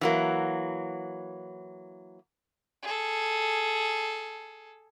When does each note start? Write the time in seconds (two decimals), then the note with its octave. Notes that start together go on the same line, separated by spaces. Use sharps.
0.01 E3 F#3 A#3
2.83 G#4 A4